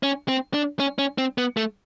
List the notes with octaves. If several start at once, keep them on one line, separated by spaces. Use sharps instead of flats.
C#4
C4
D4
C#4
C#4
C4
B3
A3